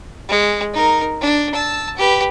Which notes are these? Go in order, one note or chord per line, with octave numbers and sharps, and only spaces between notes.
G#3
D#4 A#4
D4
A5 E6
G4 B4